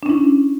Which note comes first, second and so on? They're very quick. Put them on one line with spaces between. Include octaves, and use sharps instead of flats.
D4 C#4 E4